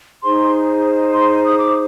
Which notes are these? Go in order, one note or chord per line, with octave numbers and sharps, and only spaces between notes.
D#4 G#4 C5 C6
C6
D#6
D6